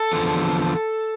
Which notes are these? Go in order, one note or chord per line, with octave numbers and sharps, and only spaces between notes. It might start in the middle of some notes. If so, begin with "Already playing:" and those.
Already playing: A4
E2 D3 F3